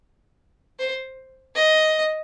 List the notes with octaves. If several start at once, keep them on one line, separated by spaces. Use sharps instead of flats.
C5
D#5